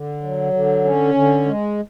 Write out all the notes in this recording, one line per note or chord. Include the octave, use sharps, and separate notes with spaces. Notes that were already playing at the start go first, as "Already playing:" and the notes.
Already playing: D3
F#3
D3
C#4
D3
G#3